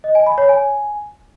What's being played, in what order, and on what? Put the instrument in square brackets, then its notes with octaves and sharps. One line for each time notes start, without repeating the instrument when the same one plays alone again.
[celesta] D#5
G#5
B5
C#5
G#5